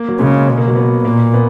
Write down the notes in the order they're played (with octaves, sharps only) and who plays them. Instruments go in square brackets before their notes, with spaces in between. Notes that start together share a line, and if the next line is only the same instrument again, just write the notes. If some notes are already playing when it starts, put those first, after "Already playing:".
Already playing: [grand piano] A#3
F#3
[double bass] C#3 [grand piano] G#3
[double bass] B2
[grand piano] A#3
F#3
B3
[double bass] A#2 [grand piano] A#3
[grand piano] B3